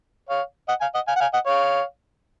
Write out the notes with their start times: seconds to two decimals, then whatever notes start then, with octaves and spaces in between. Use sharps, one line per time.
0.29 C#5 F5
0.69 D#5 F#5
0.81 F5 G#5
0.94 D#5 F#5
1.08 F5 G#5
1.16 F#5
1.21 F5 G#5
1.34 D#5 F#5
1.46 C#5 F5